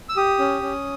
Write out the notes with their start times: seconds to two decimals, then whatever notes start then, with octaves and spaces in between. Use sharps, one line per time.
0.09 E6
0.17 G4 D#6
0.39 C#4
0.62 C#4